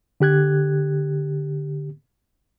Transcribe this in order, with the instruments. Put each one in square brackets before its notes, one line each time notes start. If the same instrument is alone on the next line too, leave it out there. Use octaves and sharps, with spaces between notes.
[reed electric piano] D3 G4 F#6 G#6